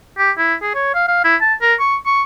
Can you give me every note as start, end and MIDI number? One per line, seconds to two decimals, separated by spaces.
0.18 0.31 67
0.38 0.54 64
0.63 0.71 68
0.75 0.91 73
0.95 1.08 77
1.08 1.23 77
1.24 1.36 64
1.41 1.54 81
1.62 1.75 70
1.80 1.96 85
2.06 2.23 85